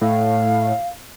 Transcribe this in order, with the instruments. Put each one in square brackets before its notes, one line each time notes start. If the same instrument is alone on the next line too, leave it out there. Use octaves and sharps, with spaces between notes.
[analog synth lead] A2 [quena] F5